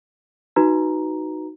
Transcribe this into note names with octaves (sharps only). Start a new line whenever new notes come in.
D#4 F#4 B4 A#5